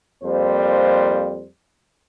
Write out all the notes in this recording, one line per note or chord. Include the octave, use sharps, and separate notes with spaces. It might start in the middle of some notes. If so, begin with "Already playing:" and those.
F2 G3 A#3 C5